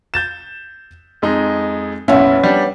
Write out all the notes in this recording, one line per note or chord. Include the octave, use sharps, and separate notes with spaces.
G6 A6 E7
F2 G#3 D#4
F#1 B1 B3 C#4 E4
G3 D4